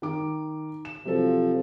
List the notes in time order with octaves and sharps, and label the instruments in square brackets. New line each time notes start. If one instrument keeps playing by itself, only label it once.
[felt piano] D#3 D6
E7
[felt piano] C3 F#3 A4 [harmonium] F3